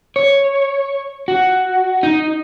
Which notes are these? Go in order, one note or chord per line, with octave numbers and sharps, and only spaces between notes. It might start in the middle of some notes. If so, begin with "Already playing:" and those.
C#5
F#4
D#4